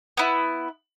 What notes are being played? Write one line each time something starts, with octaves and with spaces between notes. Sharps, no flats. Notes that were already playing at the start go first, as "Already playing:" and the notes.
B3 E4